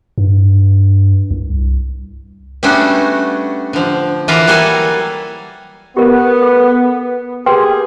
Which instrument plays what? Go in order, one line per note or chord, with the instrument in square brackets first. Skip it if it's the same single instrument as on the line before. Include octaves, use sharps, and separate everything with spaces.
[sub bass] G2
C2
[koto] G3 A3 B3 C#4 D4 F#4
D3 F3
E3 F4 F#4 A#4 B4 D5
F#3 G3 A#3 A4 G#5
[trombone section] B3 [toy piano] G4 A#4
[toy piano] A4
[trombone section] A#3 G4 G#4 [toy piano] B4 G5 C6